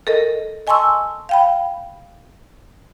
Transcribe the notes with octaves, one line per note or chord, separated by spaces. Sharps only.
A4 A#4 D#5
D#5 G#5 A5 C6 C#6 E6
F5 G5 B5